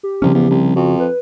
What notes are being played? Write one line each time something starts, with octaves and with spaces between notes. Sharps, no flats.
G4
C2 C#3 F3 C#4
E2
C2
F2 F#4
B4